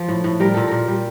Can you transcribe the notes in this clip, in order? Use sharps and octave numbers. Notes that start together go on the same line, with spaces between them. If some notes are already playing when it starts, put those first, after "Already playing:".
Already playing: F3
A2
A2
G3 A#4
A#2 A4
A#2 A#4
G3